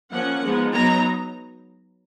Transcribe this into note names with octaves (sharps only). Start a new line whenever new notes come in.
F3 A#3 C#4 F#5
F3 G#3 B3 D#4
F#3 B3 D#4 A#5